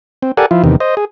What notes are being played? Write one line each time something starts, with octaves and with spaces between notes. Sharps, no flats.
C4
G4 A4 A#4 D5 F#5 G#5
F3 E4 F4
E2 C3 D#3
C5 D#5
G#4